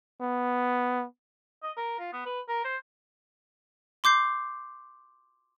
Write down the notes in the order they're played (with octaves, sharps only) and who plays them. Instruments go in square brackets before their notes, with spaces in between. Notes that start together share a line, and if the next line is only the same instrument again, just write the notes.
[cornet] B3
[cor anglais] D#5
A#4
F4
B3
B4
A#4
C5
[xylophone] C6 D6 G6 C7